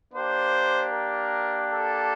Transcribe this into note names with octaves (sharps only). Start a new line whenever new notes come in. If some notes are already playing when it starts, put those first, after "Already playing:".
A#3 D4 G4 C5
A#4
A4